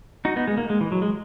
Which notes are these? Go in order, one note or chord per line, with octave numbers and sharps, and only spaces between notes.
D#4 F#4
B3 D#4
G#3
A#3
G#3
E3
F#3
G#3